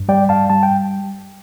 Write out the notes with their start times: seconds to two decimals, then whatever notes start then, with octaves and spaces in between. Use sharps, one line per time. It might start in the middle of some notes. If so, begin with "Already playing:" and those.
Already playing: G2
0.09 G3 D5 G5
0.29 G2 F5 A5
0.50 G3 A5
0.63 G5